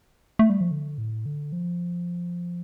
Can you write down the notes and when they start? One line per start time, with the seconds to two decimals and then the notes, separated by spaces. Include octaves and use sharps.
0.39 A3
0.50 G3
0.61 F3
0.71 D3
0.98 A2
1.26 D3
1.52 F3